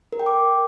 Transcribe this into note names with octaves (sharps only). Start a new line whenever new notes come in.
A#4
G5
D6